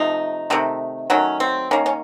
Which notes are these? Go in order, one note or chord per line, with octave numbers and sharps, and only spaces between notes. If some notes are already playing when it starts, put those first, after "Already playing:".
Already playing: C3 F3 A3 D#4
C3 D#3 A3
D#3 F#3 A3 C#4
C4
D#3 A#3 C#4
C#4